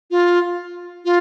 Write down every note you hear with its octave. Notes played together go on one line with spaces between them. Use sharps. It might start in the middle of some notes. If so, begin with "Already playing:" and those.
F4
F4